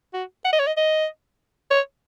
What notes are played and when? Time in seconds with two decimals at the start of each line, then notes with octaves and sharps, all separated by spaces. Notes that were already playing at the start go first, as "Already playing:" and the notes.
0.14 F#4
0.45 F#5
0.53 D#5
0.59 C#5
0.67 D#5
0.77 D#5
1.71 C#5